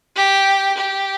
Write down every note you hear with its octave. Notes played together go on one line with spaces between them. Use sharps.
G4
G4